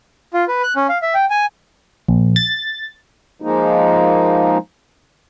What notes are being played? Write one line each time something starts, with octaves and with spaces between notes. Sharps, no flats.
F4
B4
F#6
C#4
F5
E5
G5
G#5
A#1
A6
F3 G#3 A#3 D#4